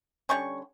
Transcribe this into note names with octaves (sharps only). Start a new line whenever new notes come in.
D3 G3 A#3 C#4 C#6